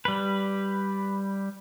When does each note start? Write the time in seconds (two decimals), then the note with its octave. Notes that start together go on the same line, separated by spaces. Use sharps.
0.05 G3 B4